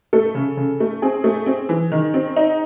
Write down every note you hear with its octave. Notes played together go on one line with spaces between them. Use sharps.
A3 A4
C#3
C#3
A3
C4 G#4
A3
C4
E3
D#3
C4
D#4